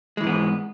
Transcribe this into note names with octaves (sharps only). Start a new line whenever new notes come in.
G#2 E3 G#3 B3